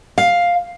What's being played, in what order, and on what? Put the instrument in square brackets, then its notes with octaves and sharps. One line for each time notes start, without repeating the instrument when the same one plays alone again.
[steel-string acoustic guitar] F5